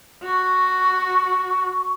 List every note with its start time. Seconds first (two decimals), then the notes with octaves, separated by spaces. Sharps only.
0.23 F#4 C#6